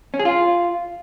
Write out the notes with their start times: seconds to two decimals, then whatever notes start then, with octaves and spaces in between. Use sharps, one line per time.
0.14 C#4
0.19 G#4
0.25 F4